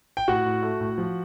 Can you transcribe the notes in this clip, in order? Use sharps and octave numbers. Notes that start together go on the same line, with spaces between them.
G5
A2 F#4 F#5
A2
A3
A2
F3